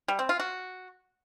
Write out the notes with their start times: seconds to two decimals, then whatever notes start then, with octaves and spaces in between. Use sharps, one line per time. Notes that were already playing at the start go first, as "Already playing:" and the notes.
0.08 G3
0.19 C4
0.29 F4
0.39 F#4